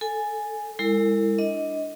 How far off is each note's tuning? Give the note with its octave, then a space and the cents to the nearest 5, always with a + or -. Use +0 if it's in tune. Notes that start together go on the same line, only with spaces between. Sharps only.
A4 +0 G#5 +0
G#3 -35 E4 +0 A#4 -45
D4 +0 D#5 +25